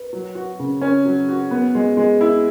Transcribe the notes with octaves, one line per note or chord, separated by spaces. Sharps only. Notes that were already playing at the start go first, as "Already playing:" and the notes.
Already playing: B4
F#3
F#4
C#3
C#4
F#3
F#4
B3
G#3
G#3
E4